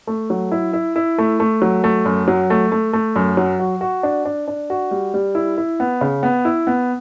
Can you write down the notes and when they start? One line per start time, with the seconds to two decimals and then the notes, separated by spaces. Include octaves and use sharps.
0.07 A3
0.30 F#3
0.52 E4
0.73 E4
0.96 E4
1.18 A3
1.40 A3
1.62 F#3
1.84 A3
2.05 F#2
2.28 F#3
2.50 A3
2.72 A3
2.93 A3
3.16 F#2
3.37 F#3
3.60 F#4
3.81 F#4
4.03 D4
4.25 D4
4.48 D4
4.70 F#4
4.91 G3
5.14 G3
5.35 E4
5.58 E4
5.80 B3
6.01 C#3
6.23 B3
6.45 E4
6.67 B3